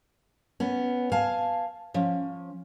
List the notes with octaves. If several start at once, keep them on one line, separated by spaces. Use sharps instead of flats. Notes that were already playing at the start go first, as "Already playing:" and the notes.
B3 C#4
F5 G#5 A5
F3 C#4